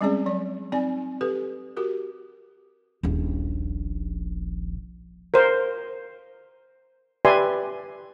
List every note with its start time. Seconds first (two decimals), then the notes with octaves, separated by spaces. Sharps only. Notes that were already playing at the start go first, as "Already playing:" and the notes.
0.01 G3 G#3 C4 C#4 G#4 D5
0.26 F#3 D5
0.72 C4 D#4 D5 G#5
1.21 G4 A4 B4
1.77 F#4 G4 A#4
3.03 D#1 A#1
5.34 A#4 C5
7.25 G4 B4 D5 E5 G#5 C6